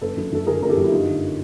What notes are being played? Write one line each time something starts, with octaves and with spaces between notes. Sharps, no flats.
F#1 A4 B4
F#2
F#2 A4
D3 G#4 A#4
F#1 A#4
G4 A4
F#2
E4
G2 D#4 F4
D3